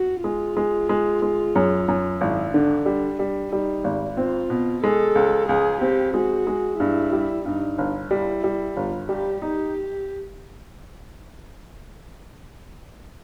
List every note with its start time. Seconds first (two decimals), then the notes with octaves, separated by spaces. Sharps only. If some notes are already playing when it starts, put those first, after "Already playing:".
Already playing: F#4
0.23 G#3 F4
0.57 G#3
0.89 G#3
1.22 G#3
1.55 F#2
1.88 F#2
2.20 G#1 E4
2.54 D3 D4
2.86 G3 D4
3.19 G3
3.52 G3 D#4
3.84 G#1
4.17 C4 F4
4.50 B2
4.83 G#3 A4
5.15 C#2
5.48 C#2 G#4
5.81 C4 G4
6.14 G#3 F#4
6.47 G#3
6.80 G2 E4
7.12 G3
7.45 G2 D#4
7.78 G1
8.11 G3 E4
8.44 G3
8.77 G1 F4
9.09 G3 G4
9.42 D#4 G4